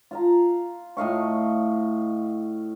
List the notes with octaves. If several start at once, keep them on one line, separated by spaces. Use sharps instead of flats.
F4 F5 A#5
A2 D#5 F5 C#6